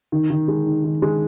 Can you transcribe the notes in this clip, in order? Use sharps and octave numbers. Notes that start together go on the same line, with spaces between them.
D#3
D#3
G#3
D#4
D#3
G#3